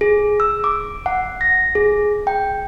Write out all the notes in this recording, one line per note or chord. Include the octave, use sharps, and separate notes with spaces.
G#4
E6
D6
F#5
A#6
G#4
G5